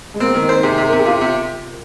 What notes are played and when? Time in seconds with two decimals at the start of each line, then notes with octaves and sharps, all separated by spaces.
0.14 G#3
0.20 A#3 C4
0.34 D#3
0.42 D#4
0.49 C5
0.63 C3 G#4
0.78 C3
0.88 A#4
0.92 C3
0.98 G#4
1.05 C3 F4
1.21 C3